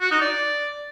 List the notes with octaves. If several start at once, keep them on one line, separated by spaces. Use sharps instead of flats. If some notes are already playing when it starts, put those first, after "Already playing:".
F#4
D#4
D5